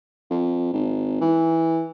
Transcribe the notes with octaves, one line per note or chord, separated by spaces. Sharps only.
F2
G#1
E3